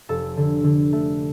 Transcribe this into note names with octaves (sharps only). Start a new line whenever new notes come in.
F1 A4
D3
D3
A3